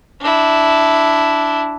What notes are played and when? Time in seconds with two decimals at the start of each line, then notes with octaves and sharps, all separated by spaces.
0.21 D4 E4